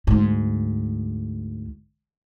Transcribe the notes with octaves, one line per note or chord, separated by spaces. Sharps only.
D2 G#2